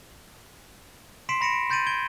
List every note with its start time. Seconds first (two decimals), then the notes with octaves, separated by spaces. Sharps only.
1.29 C6 B6 C7 D7 E7
1.41 B5 A#6 C#7 D7 E7
1.52 D7
1.70 C6 G6 A6 D7 D#7 F#7
1.87 G#6 D7 G7